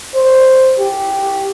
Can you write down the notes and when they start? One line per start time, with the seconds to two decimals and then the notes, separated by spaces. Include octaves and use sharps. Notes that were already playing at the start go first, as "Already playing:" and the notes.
0.14 C5
0.79 G4